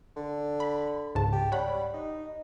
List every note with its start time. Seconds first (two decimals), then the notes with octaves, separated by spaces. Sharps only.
0.16 D3
0.60 B5
1.15 C#2 G#2 A5
1.33 G4
1.52 G3 C#5 F#5 B5
1.94 D#4